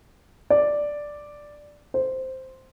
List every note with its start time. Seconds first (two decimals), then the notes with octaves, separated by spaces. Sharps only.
0.50 D5
1.94 C5